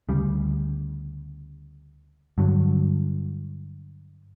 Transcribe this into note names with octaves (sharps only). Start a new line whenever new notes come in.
D2 C#3 G3
G2 D3 F#3